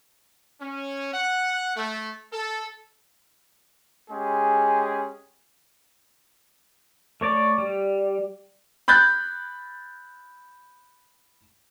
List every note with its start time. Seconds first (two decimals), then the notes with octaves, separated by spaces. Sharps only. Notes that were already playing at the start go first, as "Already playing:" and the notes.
0.61 C#4
1.13 F#5
1.76 A3
2.33 A4
4.10 G#3 C#4 G4 G#4 G#5
7.21 A3 C#5 D5
7.58 G3
8.88 B5 F#6 G6 A6